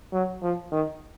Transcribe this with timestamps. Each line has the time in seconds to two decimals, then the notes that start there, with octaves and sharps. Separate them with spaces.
0.13 F#3
0.42 F3
0.72 D#3